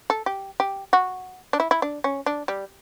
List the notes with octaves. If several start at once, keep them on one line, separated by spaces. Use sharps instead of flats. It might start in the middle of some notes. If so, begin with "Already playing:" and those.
A4
G4
G4
F#4
D4
E4
E4
D4
C#4
D4
G3